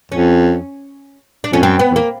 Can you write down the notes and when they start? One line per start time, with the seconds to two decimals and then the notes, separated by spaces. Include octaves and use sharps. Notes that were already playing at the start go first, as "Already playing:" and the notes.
0.12 F2 C#4
1.44 D4
1.52 F2 C#4
1.62 F#2 C4
1.79 B3
1.91 E2
1.96 A#3